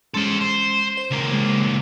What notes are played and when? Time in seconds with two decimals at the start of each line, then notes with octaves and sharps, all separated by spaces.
0.14 G#3 C#4 A4 C5 C6
0.41 C5
0.97 C5
1.11 C#2 A#3
1.33 G#3